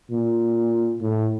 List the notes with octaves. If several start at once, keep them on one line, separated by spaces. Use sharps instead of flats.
A#2
A2